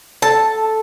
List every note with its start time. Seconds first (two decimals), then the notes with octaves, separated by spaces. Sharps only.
0.22 A4 A5